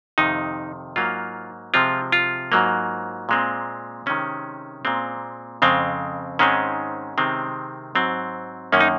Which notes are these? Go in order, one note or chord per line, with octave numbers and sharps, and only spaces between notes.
F2 C3 D#3 D#4
G#2 F#3 A#3 F4
C3 F3 G#3 C4 F4
F4
G#2 F#3 A#3
A#2 G#3 C4
C3 D#3 G#3 C4 C#4
A#2 G#3 C4
F2 C#3 G#3 C4
G#2 D#3 G#3 C4 C#4
C3 D#3 G#3 C4
G#2 F#3 C4
F#2 D#3 A#3 C#4
D#4